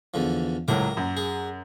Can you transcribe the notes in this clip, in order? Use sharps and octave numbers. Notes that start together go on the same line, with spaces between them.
E2 D3 F3
C#2 A2 F#3 A#4 D6
F#2
G#4